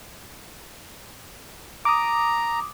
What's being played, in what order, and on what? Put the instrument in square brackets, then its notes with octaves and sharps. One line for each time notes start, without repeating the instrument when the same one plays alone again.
[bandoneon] A#5 [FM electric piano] D6 D#6